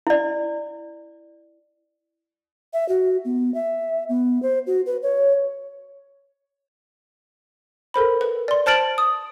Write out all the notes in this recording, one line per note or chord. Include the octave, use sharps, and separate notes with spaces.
E4 D5
E5
F#4
B3
E5
B3
C5
F#4
B4
C#5
A4 A#4 C5 B5
B4
D5 C6
C5 A5 F6 A6 D7 F#7
D#6